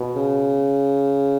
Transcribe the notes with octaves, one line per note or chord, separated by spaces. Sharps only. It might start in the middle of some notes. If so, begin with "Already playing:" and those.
Already playing: B2
C#3